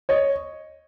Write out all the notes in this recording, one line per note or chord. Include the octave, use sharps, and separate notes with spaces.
C#5 D#5